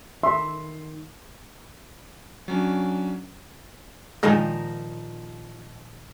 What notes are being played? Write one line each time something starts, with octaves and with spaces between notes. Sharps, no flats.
D#3 E5 C6
F#3 C#4 D4
A#2 D#3 F3 G#3 D#4 A5